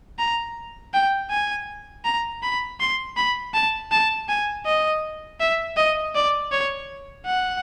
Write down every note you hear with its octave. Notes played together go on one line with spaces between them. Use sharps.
A#5
G5
G#5
A#5
B5
C6
B5
A5
A5
G#5
D#5
E5
D#5
D5
C#5
F#5